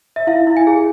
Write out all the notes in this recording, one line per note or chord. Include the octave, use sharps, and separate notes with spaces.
E5
E4 F5
E4
G#5
G#4